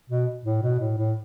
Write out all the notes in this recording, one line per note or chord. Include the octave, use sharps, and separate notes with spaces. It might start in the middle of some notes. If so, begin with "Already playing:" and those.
B2
A2
B2
A2
A2